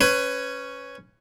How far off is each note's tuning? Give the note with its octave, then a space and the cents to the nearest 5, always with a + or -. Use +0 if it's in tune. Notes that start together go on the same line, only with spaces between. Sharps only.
C#4 +0 B4 +20